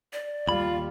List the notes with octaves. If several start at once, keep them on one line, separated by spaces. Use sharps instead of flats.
D5
D#2 G3 F4 B5